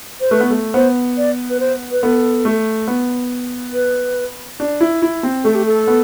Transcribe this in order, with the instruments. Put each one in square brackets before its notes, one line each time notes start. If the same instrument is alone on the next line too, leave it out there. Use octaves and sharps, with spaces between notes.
[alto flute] C5
[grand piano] A3 [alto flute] B4
[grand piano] B3
A3
[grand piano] B3 [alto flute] C5
[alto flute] D5
B4
C5
B4
[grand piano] B3 [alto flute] A4
[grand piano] A3
B3
[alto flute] B4
[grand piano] D4
E4
E4
C4
[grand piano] A3 [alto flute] A4
[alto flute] G4
A4
[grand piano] B3